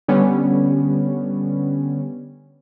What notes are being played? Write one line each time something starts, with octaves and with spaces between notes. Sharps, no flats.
D3 G3 B3 C#4